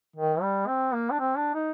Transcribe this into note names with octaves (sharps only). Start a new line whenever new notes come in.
D#3
G3
C4
A#3
D4
C4
D4
D#4